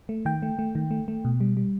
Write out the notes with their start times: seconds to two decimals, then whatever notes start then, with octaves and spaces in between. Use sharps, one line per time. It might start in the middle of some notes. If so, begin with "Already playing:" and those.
0.09 A3
0.25 D#3 G5
0.42 A3
0.59 A3
0.75 D#3
0.91 A3
1.08 A3
1.25 B2
1.40 G3
1.57 G3